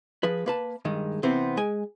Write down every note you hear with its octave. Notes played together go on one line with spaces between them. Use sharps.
F3 G#4 B4
A#3 B4 A5
G2 D#3 G#3
C3 E3 B3 C4
G#3 G#5